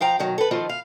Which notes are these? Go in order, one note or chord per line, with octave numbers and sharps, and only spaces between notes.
F3 F5 G5 A#5
B2 D#3 F#3
A4 B4
D#3 F3 C4 F4 A4
F5